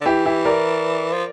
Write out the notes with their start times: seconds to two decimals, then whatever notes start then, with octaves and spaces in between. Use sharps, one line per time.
0.01 D3
0.06 E3 E4 G4
0.26 E4 G4
0.45 A#4 D5
1.13 F3